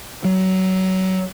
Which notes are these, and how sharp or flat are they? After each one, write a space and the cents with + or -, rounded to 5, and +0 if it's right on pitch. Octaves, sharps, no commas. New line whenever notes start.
F#3 +25